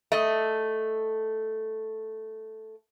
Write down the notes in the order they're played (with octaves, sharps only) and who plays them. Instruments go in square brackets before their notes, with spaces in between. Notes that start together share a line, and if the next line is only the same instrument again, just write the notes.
[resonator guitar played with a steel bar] A3 D#5